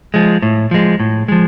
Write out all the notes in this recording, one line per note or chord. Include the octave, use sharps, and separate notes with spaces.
F3 G#3
A2
F3 G#3
A2
F3 G#3